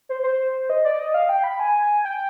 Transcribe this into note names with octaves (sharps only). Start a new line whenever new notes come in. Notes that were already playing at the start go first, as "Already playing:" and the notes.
C5
C5
D#5
D5
D#5
F5
G5
B5
G#5
G5